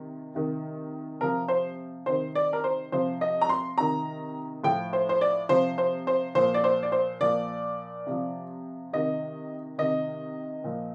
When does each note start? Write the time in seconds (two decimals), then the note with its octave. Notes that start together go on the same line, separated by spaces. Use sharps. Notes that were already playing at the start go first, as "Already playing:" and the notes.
Already playing: C3 D#3
0.35 C3 D#3
1.21 C3 F3 A#4
1.48 C5
2.06 C3 D#3 C5
2.35 D5
2.53 A#4
2.64 C5
2.92 C3 F3 C5
3.21 D#5
3.41 A#5
3.49 C6
3.78 C3 D#3 A#5
4.64 A2 F3 G5
4.93 C5
5.09 C5
5.21 D5
5.49 C3 F3 C5
5.78 C5
6.07 C5
6.35 A#2 F3 C5
6.54 D5
6.64 C5
6.83 D5
6.92 C5
7.21 A#2 F3 D5
8.07 C3 F3
8.93 C3 D#3 D#5
9.78 C3 D#3 D#5
10.64 A#2 F3